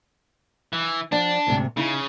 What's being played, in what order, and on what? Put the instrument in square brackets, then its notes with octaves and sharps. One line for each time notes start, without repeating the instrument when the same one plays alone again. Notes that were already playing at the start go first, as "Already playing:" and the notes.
[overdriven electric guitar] E3
[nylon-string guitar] F3 D5 F#5 [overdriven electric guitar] D4
[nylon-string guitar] D2 G#2 C3
[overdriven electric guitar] C#3 [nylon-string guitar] D#4 E4